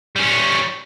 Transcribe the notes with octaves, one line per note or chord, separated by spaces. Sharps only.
G3 C#4